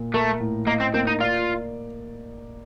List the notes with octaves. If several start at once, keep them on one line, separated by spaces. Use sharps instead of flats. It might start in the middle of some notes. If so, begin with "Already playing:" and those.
Already playing: A#2
A3 A#4
A2
A#3 D#5
C4
A#3 C4
D#4
F4 D5